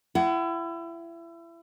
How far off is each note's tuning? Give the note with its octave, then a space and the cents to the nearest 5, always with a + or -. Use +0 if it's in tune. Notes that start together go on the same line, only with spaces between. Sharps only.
E4 +30 F#5 +35